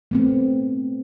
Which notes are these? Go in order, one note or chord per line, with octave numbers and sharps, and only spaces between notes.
A3 B3 C4